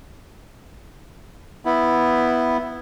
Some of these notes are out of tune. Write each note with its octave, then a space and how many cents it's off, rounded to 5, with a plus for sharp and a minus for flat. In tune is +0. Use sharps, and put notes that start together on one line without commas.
B3 +0 E4 +0